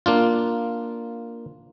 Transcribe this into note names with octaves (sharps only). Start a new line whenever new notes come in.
A#3 D4 F4